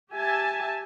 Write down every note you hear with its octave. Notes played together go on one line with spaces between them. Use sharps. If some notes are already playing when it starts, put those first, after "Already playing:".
G4 E5 G#5 A5